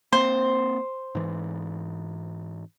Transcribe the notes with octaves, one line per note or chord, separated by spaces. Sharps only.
A#3 C4 C5
G#2 E3